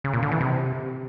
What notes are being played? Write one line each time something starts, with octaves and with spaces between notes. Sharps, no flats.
C#3
A#2
D3
E3
C3